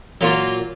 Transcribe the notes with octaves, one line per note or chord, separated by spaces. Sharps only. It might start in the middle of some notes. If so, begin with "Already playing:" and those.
A#2 F#3 A#3 F4